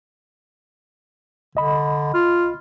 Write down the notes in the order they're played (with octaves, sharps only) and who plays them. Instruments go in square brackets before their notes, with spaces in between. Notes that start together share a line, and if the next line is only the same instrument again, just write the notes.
[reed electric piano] C2 D#5 B5 [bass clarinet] D3
[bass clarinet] F4